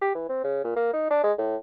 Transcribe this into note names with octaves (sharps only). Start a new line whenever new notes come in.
G4
E3
C4
C#3
A#2
A#3
D#4
D4
G#3
A2